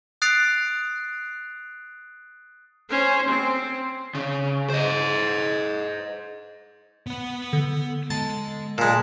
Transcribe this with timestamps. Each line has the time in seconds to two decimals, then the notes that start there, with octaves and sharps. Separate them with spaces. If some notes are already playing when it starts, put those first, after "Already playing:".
0.22 D#6 F#6 A6 C7 D7 F7
2.90 C#4 C5
3.28 C4
4.15 C#3
4.70 C5 D#5
7.07 B3 F#5
7.53 D3
8.10 G#3 A5
8.78 A#2 G#3 A5